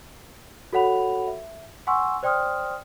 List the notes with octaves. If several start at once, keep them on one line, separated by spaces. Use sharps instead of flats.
F#4 A4 C#5 F#5 B5 F7
E5
F#5 G#5 C6 C#6 E6
C5 D5 G5 C6 D#6 F6